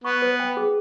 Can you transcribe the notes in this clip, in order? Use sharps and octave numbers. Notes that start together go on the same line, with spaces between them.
B3 C#6
B4
G5
G#4